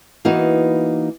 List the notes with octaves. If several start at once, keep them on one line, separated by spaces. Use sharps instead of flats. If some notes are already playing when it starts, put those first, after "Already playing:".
E3 A#3 B3 D#4 F#4